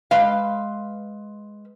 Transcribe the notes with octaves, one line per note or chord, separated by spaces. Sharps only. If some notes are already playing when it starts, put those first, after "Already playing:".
G#3 B4 F5